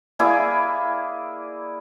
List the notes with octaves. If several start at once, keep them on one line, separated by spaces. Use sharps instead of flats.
A#3 E4 G#4 D5